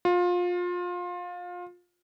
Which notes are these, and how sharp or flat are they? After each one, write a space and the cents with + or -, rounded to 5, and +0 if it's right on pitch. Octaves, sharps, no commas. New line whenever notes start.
F4 +25